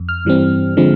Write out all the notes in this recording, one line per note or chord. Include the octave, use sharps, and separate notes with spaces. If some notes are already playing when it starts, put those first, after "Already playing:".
Already playing: F2
F6
G2 E3 G3 C4
D3 F3 G#3 C4